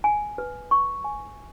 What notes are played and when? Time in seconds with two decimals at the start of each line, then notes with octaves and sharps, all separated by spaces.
0.04 G#5
0.38 B4
0.71 C#6
1.04 G#5